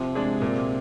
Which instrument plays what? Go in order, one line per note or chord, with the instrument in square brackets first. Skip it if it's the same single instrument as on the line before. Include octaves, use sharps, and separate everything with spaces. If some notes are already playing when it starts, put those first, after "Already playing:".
Already playing: [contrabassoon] C3 [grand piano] F3
[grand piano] G#3 D4 G#4
A#2